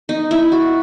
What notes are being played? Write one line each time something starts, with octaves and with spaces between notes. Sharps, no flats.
D#4
E4
F#4